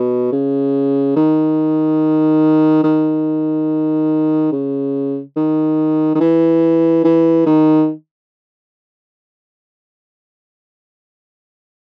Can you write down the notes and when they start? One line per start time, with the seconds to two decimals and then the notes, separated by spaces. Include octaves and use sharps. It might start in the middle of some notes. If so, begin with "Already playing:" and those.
Already playing: B2
0.32 C#3
1.16 D#3
2.84 D#3
4.52 C#3
5.37 D#3
6.15 D#3
6.20 E3
7.04 E3
7.46 D#3